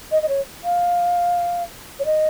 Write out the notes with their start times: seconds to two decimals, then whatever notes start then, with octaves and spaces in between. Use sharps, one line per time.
0.11 D#5
0.22 D#5
0.28 C#5
0.64 F5
1.99 C#5
2.05 D#5